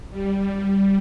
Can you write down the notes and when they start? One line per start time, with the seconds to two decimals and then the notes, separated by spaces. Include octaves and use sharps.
0.11 G3